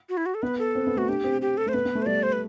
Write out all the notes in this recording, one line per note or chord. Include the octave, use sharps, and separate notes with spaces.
F#4
E4
F#4
A4
B3 B4
A4
C4
B3
A3 F#4
D4 G4
C4
G4
A4
A3 C5
B3 B4
B3
A3
C5
G3 D5
C5
B4